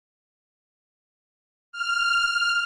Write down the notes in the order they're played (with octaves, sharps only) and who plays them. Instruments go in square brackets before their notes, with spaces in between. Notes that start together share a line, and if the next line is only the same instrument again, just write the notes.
[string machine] F6